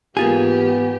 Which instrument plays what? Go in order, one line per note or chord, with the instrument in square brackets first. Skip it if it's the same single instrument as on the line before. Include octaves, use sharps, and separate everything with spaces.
[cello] G#2 E3 [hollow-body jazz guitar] A#3 F4 G#4 [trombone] B3 [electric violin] G4